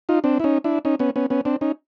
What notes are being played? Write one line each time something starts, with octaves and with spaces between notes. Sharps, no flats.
D#4 F4
C4 D4
E4
C#4 D#4
D4 E4
C#4 D#4
B3 C#4
B3 C#4
B3 C#4
C4 D4
C#4 D#4